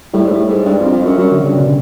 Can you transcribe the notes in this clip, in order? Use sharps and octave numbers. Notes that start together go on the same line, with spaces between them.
A2 G3
G#2
A2
G#2
G2
F2
F2
F#2
F#2 F#3
D3
G2 C#3
B2